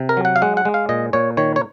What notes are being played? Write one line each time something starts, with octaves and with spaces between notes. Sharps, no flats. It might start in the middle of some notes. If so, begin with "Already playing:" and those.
Already playing: C3
A#4
F#3
F#5
F5
G#3 F#5
F#5
G#3
F5
A#2 D#5
A#2 C#5
D#3 C#5
C#5